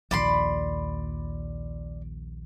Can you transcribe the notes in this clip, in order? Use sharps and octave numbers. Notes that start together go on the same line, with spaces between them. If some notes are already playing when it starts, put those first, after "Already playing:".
A#1 D#2 D5 B5 C6